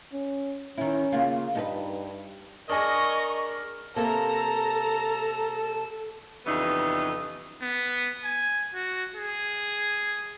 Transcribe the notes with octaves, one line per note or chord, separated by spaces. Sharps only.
C#4
D#3 C#4 E4
C#3 A#3 F4
G2 D#4 A4 B4
D4 G#4 A#4 D#5 C#6
C3 A#3 A4 A5 A#5
F2 C#3 E3 G3 B3 D#4
B3
G#5
F#4
G#4